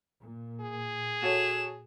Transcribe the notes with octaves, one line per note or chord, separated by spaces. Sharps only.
A#2
G#4
F#4 A4 C#5 E7